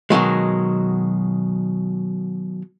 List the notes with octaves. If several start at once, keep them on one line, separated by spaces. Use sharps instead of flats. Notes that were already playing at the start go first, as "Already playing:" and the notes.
B2 D#3 F#3 G#3